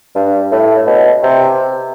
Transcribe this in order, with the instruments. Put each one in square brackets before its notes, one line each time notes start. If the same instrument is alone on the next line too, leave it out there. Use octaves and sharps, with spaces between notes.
[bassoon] G2
A2
B2
C3